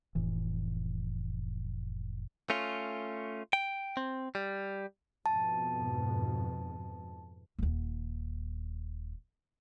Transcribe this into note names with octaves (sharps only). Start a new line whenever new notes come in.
F1 A2 E3
A3 C#4 F4
G5
C4
G3
F2 G#2 B2 A5
D#1 D#2